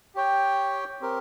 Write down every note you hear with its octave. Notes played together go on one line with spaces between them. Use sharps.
G4 C#5 G5
C4 G4 A#4